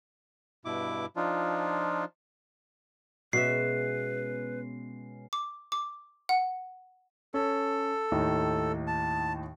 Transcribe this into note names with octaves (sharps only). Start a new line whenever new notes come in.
G2 B2 E4 D6
F3 D4 D#4 F4
B2 G#3 B3 C#4 B4 E5 C7
D6
D6
F#5
C#4 A4
D#2 A2 D#4
A5